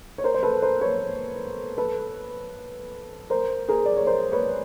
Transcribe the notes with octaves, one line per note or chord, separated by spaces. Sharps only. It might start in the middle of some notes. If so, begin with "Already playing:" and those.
C#5
A#4 C5
C5
A4 B4
A#4 C5
B4 C#5
A4 B4
A#4 C5
G#4 A#4
D5
C#5
A#4 C5
B4 C#5